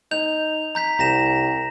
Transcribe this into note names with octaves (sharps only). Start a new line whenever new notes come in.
D#4 G6 F7
A#5 G6 B6
C2 A#5 A#6 E7